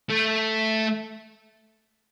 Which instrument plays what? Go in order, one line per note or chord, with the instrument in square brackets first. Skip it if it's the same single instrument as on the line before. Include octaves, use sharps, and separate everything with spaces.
[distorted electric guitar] A3